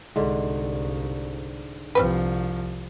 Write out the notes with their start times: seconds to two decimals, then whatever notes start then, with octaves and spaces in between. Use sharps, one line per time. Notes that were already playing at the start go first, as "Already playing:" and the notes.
0.16 C2 G#2 D3
1.95 C2 F3 G3 C4 B4